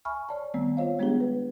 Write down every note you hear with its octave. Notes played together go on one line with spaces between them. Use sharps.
E5 G#5 B5 C#6 F6
C#5 D5 A5
D#3 G3 A3 B3 C4
F4 C5 C#5 D#5 F5
G3 G#3 B3 D4 G4 G#4
B4